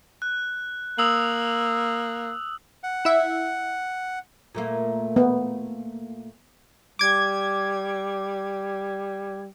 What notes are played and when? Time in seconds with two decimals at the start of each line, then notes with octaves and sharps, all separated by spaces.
0.22 F#6
0.98 A#3 D#6 E6 F#7
2.83 F#5
3.05 E4 E5
4.55 A#2 A3 A#3
5.16 B3
6.99 G3 D6 G#6